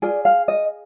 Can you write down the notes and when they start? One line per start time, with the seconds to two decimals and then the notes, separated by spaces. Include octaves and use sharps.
0.02 F4 G#4 D5
0.25 F5
0.48 D#5